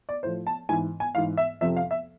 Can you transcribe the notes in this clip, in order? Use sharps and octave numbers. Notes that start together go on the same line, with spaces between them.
D5
A2 F3 C5
A5
G#2 E3 G#5
G#5
G#2 E3 F5
E5
F2 C3 F3 E5
F5
E5